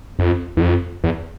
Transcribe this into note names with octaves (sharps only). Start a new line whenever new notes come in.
F2
E2
F2
E2